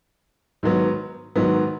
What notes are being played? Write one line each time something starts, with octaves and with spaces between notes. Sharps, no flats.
G#2 D#3 F#3 B3
G#2 D#3 F#3 B3